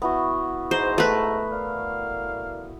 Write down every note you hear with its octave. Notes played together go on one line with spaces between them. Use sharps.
B3 E4 F#4
G#2 C5 A#5
A3 B4
A#4 D5 F5